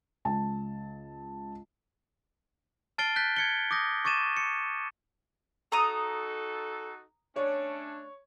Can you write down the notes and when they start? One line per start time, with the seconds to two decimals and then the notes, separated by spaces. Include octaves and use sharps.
0.25 C#2 A5
2.98 A5 F6 A6 C7 D7 G7
3.16 F#6 G6 A6 B6
3.36 G#6 C#7 G7
3.71 D6 D#6 G6 A#6
4.05 C#6 D6 A6 D#7 E7
4.37 C#7
5.72 D#4 F#4 A4 A#5 D#6
7.36 A3 C#4 D4 C#5